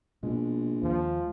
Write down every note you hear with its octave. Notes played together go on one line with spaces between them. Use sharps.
A#1 B2 G#3
D#2 D#3 F3